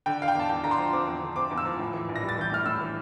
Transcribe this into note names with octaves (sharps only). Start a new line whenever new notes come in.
D3 G5
D3 F5
G5
E2 A5
E2 G5
D3 A#5
C6
F3
C4 D6
E2
D3
C4 D6
E2
E6
F3
A2
E3
A#1
A#6
G3
A6
E3 G6
A2 F6
A2 E6
E3